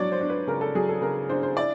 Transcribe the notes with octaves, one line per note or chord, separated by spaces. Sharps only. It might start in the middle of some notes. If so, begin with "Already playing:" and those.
Already playing: F#3 D4 C#5 D5
C5
D4
B4
C#3 A#4
A4
F#3 G#4
A4
C#3 A#4
D4 C5
C5
E4 D5